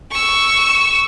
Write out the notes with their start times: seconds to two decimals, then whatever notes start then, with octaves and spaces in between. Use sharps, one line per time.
0.11 C#6 E6